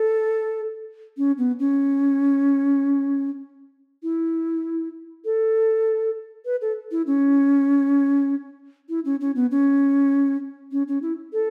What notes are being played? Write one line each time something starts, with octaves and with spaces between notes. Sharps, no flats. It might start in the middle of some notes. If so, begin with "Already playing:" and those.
Already playing: A4
C#4
B3
C#4
E4
A4
B4
A4
E4
C#4
E4
C#4
C#4
B3
C#4
C#4
C#4
E4
A4